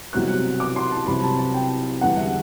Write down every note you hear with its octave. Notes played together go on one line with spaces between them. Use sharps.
C2 B2 F#3 C4 F#6
D6
C6
A5
C2 C3 F#3 C4 B5
A5
A5
G5
E2 D3 G3 F#5
E5